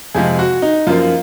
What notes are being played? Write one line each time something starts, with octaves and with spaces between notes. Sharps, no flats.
F2 C3 F3 G#3 G#4
F#4
D#4
F#2 F3 A#3 F4